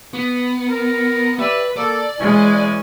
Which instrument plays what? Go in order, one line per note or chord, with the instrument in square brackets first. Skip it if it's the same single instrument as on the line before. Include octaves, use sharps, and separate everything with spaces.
[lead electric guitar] B3
[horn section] A#4
[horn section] G4 D5 E5 [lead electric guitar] B4
[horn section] A#3 A4 [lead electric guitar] D5
[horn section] E3 C#4 G#5 [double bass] G#3